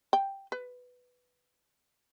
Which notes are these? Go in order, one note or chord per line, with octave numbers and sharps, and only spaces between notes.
G5
B4